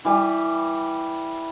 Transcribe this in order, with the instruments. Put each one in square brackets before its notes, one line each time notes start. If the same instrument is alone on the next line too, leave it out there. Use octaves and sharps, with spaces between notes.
[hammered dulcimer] E3 G3